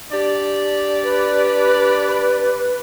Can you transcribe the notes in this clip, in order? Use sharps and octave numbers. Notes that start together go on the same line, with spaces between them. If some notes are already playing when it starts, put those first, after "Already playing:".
D4 G4 D5
B4